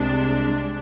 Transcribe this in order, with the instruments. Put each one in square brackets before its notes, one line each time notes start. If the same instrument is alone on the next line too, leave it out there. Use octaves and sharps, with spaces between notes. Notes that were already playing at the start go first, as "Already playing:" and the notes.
Already playing: [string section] C2 C3 G#3 D4